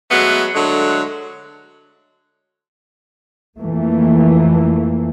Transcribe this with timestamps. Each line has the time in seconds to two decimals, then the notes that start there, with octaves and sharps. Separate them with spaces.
0.11 F#3 G#3 A3 B3
0.54 D3 F#3 G#3 A3
3.60 F2 E3 A3 A#3